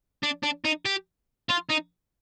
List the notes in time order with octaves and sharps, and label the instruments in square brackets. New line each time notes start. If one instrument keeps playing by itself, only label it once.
[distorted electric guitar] D4
D4
D#4
G4
F4
D#4